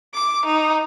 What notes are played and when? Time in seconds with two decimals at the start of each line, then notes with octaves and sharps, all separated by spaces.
0.14 D6
0.45 D#4